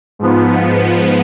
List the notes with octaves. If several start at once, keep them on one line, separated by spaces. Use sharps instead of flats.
G#2 F3 B3